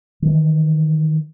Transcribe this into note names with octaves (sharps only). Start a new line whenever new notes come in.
D#3 E3